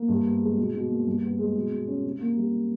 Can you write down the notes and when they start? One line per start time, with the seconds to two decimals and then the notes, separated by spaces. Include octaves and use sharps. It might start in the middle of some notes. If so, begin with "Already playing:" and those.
Already playing: A#3
0.08 G2
0.25 B3
0.42 G#3
0.57 B2
0.74 B2
0.90 A#3
1.06 G2
1.23 B3
1.38 G#3
1.55 B2
1.72 B2
1.87 C#4
2.04 C3
2.21 A#3
2.36 G3